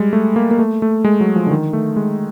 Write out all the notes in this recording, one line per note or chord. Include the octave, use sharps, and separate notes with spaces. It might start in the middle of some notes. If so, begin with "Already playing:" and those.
Already playing: G3 G#3
A3
A#3
A#3
A3
A3
G#3
F#3
F3
D3
D#3
A3
G#3